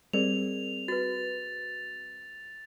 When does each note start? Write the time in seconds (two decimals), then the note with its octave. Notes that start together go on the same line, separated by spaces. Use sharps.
0.13 G3 C4 G#4 A#4 D5 F7
0.88 F#4 B4 A6